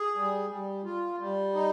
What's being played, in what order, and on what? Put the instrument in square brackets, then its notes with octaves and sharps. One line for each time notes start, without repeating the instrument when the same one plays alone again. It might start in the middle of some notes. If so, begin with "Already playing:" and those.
Already playing: [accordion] G#4
G3
G3
F4
G3
D#4